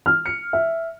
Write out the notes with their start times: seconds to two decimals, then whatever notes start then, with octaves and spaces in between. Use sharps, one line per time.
0.06 F6
0.26 C#7
0.53 E5